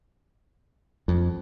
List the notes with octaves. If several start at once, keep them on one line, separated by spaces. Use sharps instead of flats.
F2